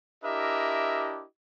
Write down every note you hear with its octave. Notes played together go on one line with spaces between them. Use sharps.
D4 E4 G4 A#4 D#5 E5